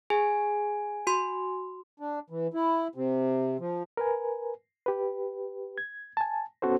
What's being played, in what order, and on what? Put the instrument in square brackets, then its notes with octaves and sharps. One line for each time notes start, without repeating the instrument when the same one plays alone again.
[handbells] G#4 [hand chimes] G#5
[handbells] F#4 C6
[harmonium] D4
E3
E4
C3
F3
[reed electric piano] A#4 B4 G#5
G4 B4
G#6
G#5 A5
B3 C#4 F#4 A4 C5